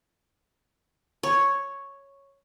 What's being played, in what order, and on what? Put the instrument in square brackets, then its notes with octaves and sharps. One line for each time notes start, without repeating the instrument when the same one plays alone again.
[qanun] C#5